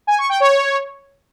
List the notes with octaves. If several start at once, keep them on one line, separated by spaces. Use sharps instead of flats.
G#5
C#6
G5
C#5